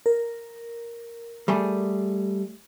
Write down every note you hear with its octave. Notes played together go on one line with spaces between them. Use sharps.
A#4
G3 A3 G#4